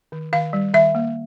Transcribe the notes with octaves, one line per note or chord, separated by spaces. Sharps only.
D#3
D#3 F5
G3
D#3 E5
A#3